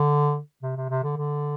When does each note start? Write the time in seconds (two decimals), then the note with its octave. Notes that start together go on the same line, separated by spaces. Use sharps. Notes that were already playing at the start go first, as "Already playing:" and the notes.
Already playing: D3
0.62 C3
0.76 C3
0.90 C3
1.03 D3
1.16 D3